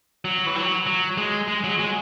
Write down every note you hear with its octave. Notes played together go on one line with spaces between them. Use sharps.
F#3
E3
F#3
F#3
G#3
G#3
F#3
G#3